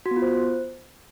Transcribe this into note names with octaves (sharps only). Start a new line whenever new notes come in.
F#4
B3
F4
C5